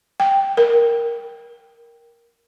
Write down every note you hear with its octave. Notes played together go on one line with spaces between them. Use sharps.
G5
A#4